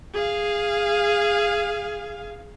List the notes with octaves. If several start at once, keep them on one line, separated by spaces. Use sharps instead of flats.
G#4 F5